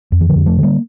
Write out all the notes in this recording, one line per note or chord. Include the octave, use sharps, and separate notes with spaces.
F2
E3
D3 F3
F2
F3 A3
D3
G3 A#3